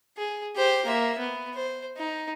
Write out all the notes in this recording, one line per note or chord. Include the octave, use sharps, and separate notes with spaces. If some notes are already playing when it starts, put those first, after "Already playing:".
G#4
G4 C5
A#3 E5
B3
C5
D#4